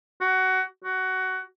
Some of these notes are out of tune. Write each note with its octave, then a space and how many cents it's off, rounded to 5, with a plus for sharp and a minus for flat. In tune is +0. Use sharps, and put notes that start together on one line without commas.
F#4 +20
F#4 +15